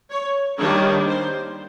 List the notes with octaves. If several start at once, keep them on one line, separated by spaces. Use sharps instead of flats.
C#5
D#3 G3 A#3 D4 C#5
C5